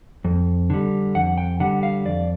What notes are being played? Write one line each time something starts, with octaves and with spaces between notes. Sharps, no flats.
F2
D3 G3
F2 F#5
G5
D3 G3 F#5
F5
F2 D5